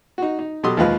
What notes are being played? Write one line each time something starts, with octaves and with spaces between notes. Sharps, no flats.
D#4 F#4
D#4
B2 F#3 G4 A4 C6 D#6
D#2 F3 G#3 F4 B4 F5